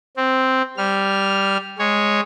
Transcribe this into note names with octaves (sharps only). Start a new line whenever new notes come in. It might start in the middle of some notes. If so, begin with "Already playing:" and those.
C4
G3 F6
G#3 C#5